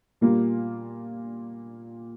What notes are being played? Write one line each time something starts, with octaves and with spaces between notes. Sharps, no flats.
A#2 G3 A#3 F4